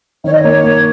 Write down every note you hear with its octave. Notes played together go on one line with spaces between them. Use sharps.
D#3 C#5
D#5
A#3 C#5
A#3